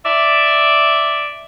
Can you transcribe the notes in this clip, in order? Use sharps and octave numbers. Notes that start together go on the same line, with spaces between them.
D5 E5